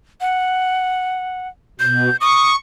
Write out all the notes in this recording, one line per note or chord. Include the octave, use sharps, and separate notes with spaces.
F#5
B2 G6
C#6 D#6